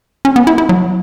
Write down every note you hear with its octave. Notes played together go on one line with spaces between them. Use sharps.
C#4
B3
E4
E4
F#3